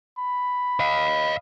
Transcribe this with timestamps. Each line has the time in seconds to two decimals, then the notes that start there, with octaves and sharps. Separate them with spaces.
0.19 B5
0.80 D#5 F5